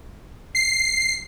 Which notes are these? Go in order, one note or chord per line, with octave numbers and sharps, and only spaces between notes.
C7